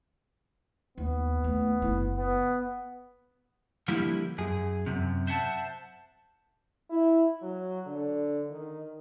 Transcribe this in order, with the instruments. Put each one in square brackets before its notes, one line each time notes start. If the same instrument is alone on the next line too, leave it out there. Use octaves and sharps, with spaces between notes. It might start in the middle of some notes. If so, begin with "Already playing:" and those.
[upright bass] D#2 [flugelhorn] B3
[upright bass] D#2 A3
F#1 E4
[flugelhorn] B3
[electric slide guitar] D3 F3 G3 A#3 E4 G4
F#2 G#4
F#2 C3
C5 E5 F#5 G#5 A5
[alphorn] E4
F#3
D3
D#3